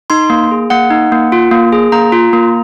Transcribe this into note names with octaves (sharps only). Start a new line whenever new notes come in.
D#4 C6
A#3
G#4
A#3 F#5
D#4
A#3
F4
A#3
G#4
A#3 A#5
F4
A#3